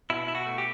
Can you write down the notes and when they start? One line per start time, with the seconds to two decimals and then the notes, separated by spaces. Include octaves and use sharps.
0.10 B2 E4
0.28 E4
0.35 F#4
0.46 A3
0.58 G4